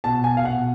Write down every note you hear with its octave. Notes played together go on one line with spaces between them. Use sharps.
B2 A5
G#5
F5
B2 F#5